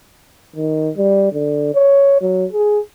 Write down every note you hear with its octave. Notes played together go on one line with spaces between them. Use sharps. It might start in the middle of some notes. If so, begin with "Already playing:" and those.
D#3
G3
D3
C#5
F#3
G#4